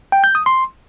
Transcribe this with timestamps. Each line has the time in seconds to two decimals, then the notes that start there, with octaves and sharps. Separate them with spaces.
0.12 G5
0.24 G6
0.35 D#6
0.46 C6